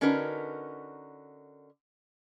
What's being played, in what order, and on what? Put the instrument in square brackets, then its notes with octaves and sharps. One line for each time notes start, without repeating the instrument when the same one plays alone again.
[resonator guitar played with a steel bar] D3 C#4 D#4 F#4 A#4 B4